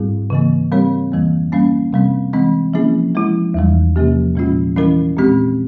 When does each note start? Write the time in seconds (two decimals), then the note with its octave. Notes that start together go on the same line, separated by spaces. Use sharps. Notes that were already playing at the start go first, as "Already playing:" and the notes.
Already playing: G#2 G3 C4 E4 G#4
0.30 C#3 E3 A#3
0.72 G3 C4 G4 A#4 C#5
1.12 F2 E3 G3 A#3
1.52 G3 A#3 C#4
1.93 C3 G3 C4
2.33 E3 G#3 C4
2.74 F3 A#3 C#4 E4 G#4
3.15 F3 G#3 E4
3.54 E2 E3 G3
3.96 C3 F3 A#3 C#4 G4
4.35 A#2 F3 G#3 C#4 F4
4.76 E3 G3 C#4 E4 A#4
5.17 A#2 G#3 C4 G4